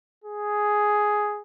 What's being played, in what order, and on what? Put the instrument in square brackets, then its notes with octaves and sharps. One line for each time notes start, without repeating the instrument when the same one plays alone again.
[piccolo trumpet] G#4